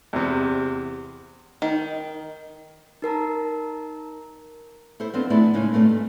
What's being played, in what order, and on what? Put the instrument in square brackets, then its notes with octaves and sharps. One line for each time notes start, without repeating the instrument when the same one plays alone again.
[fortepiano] E2 C3
[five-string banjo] D#3
[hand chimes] D#4 A#4 A5 A#5
[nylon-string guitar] E4 A4 C5
F3 B3 C4 D4 F4 C5
A3 B3 D4 E4 G#4 D5
A2 C#3 G#3 A#3 D#4
G2 A3 A#3 C4 D4
G#2